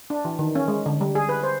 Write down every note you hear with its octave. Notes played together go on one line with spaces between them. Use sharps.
D4
E3
D#3
C#4
G#3
D3
G3
G#4
B4
C5